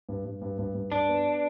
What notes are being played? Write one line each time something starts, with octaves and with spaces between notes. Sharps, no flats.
G2
G2
G2
G2
G2
G2 D4
B3